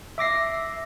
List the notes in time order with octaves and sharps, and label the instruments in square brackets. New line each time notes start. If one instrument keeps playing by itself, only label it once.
[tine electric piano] E5 D6 A#6 C7